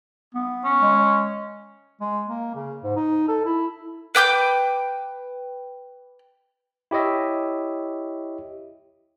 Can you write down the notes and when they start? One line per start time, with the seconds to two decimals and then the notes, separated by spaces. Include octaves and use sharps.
0.35 B3
0.65 C#4
0.82 G#3
2.01 G#3
2.28 A#3
2.55 C#3
2.83 G#2
2.96 D#4
3.28 A4
3.45 E4
4.15 B4 G5 D6 G6
6.91 E4 G4 C#5 D#5 E5